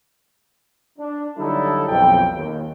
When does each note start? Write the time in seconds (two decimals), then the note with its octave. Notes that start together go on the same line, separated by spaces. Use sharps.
0.99 D4
1.37 D3 F#3 G3 D#4 E4 A4
1.88 B1 F2 G5
2.35 D#2